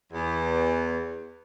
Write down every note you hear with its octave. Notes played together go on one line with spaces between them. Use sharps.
E2